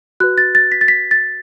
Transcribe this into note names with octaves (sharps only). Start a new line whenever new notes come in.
F#4 B4 F#6
A6
A6
B6
A6
B6
A6